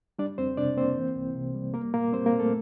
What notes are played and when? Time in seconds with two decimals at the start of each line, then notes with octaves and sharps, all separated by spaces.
0.19 G3 D4 D5
0.38 F2 C4 C5
0.57 C3 D4 D5
0.77 A#3 C4 C5
0.97 E3
1.16 C2
1.35 C3
1.54 G3
1.74 A#3 A#4
1.94 A#2 A#3 A#4
2.13 G3 C4 C5
2.26 A#3 A#4
2.32 A#2
2.39 A3 A4